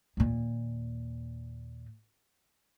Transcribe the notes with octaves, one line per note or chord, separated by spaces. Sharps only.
D#2 A#2